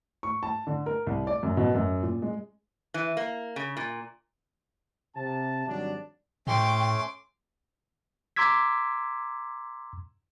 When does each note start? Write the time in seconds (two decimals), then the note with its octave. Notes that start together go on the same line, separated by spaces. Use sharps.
0.23 C#6
0.43 A5
0.67 D3
0.86 A#4
1.07 C2
1.27 D5
1.43 F#2
1.57 B2
1.75 F#2
2.03 A#2
2.22 G#3
2.94 E3
3.17 A#3
3.56 C#3
3.77 A#2
5.15 C3 A5
5.68 G#1 F#3 G3 D4
6.47 A2 A3 C#4 C#5 G5 C6 D6
8.36 A#5 C6 D6 E6 G#6 B6